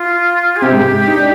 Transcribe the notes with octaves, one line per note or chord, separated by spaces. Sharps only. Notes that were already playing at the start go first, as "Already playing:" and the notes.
Already playing: F4
G#4
C3 C4 G4
G#2 G#3
D#4
D4